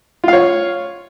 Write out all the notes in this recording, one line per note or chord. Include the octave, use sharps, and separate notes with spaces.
F4 C#5 F5